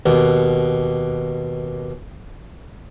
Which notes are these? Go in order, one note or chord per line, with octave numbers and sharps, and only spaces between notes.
D#2 B2